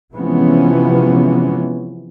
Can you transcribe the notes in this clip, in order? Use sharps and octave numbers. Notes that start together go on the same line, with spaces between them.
C3 E3 F3 G#3 B3 C#4